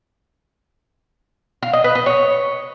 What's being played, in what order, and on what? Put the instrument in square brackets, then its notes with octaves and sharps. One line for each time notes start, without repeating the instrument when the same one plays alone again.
[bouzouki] F5
D#5
B4
D#5
C#5